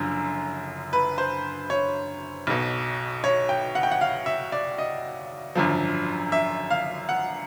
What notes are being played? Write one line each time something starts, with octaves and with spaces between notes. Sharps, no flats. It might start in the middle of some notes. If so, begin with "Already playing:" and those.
Already playing: F#1 F#2 D3 F3
B4
C5
C#5
B1 B2
C#5
G5
F#5
G5
F#5
F5
E5
D5
D#5
G#1 F#2 D3 F3
E5
F5
F#5